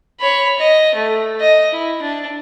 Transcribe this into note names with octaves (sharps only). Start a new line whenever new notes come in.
C#5 B5
D#5
A3
D#5
E4
D4